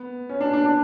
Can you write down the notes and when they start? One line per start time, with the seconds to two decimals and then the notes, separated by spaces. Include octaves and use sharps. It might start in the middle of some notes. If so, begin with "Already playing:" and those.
Already playing: B3
0.29 C#4
0.41 D4
0.53 D4
0.66 D4